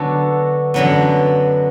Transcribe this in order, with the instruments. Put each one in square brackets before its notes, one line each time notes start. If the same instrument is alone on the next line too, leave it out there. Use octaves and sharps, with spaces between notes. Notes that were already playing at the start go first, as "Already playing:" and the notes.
Already playing: [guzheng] D3 F#3 B3 F#4 A4
F#2 D3 F#3 B3